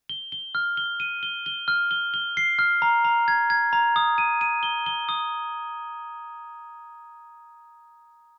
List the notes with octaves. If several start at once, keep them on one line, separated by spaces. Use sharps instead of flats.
G7
G7
F6
G7
D#7
G7
G7
F6
G7
G7
C7
F6
A#5
A#5
G#6
G#6
A#5
D#6
D#7
D#7
G7
G7
D#6